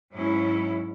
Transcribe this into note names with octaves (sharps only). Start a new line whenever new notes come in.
G#2 F#3 C#4 E4